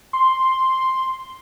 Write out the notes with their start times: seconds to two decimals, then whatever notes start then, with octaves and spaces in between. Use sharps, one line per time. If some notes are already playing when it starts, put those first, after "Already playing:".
0.13 C6